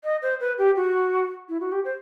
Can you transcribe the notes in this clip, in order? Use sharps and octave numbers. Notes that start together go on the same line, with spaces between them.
D#5
C5
B4
G4
F#4
E4
F#4
G4
C5